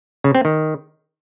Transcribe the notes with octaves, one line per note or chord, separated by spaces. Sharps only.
C#3
C4
D#3